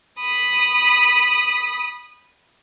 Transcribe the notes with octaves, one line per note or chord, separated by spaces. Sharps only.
B5 D#6